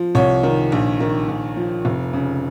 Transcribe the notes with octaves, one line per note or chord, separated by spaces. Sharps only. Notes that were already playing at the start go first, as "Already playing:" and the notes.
Already playing: F3
C2 C#5
D#3
A#1
D#3
A#1
F3
F1
C#3